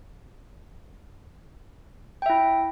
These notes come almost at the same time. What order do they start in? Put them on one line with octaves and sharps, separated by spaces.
G5 E5 E4